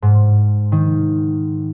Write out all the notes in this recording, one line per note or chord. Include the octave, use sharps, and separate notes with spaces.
G#2
D#3